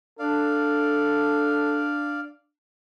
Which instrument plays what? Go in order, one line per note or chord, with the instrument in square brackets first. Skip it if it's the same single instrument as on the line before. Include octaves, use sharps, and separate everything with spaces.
[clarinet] D4 [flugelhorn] A4 [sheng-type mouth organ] D5 F5